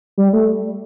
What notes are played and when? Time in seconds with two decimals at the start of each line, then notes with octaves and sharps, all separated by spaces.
0.18 G3
0.33 A3